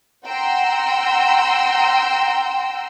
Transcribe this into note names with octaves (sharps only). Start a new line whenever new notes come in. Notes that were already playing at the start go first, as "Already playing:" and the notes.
F#5 G5 A#5 C6 E6